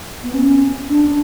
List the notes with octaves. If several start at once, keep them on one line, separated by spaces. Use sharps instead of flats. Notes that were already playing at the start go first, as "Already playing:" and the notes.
B3
C#4
D4